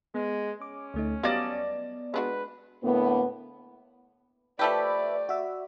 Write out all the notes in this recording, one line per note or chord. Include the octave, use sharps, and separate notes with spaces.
G#3 B3
C#4 D6
D2 A3 D#4
F#3 G3 B3 F4 D5 D#5 A5
G#3 D4 F#4 B4
A2 D3 A#3 B3
F3 A3 G4 B4 D5 E5 B5
F#4 E5